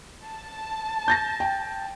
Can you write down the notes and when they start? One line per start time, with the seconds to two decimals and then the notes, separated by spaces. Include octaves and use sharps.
0.25 A5
1.08 G6 A6 A#6
1.40 G5